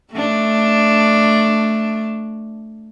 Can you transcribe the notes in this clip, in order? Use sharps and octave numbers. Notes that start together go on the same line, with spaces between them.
A3 D4